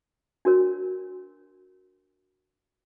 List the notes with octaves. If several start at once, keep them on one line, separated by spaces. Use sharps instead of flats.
D4 F#4 A#4 C#5